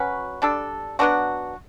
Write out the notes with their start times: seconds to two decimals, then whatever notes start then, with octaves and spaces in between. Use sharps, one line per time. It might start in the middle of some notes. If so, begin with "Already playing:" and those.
Already playing: F#3 C#4 F#4 B4
0.42 G3 D4 A4
0.99 F#3 B3 D4 F#4